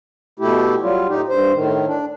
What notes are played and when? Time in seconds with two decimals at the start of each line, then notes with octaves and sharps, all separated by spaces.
0.39 B2 A3 E4 G4
0.81 F#3 G3 F4
1.08 A2 D#4 G4
1.29 G2 C5
1.53 A2 D#3
1.87 D4